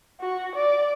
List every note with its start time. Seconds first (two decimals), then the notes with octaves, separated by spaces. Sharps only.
0.21 F#4
0.56 D5